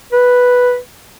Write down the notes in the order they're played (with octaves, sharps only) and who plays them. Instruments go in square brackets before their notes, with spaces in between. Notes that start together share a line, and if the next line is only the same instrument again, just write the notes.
[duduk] B4